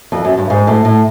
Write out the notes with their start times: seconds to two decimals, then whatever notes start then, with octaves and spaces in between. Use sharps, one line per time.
0.12 F2
0.25 F#2
0.38 G2
0.50 G#2
0.67 A2
0.85 A2